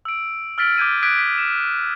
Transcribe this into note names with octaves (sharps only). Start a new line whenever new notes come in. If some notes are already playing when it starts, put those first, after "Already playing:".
E6 D7
E6 F6 A6 B6 D7 F#7
D6 G6 G#6 D#7
D#6 F#6 G#6 B6 D7
B6 D7
E7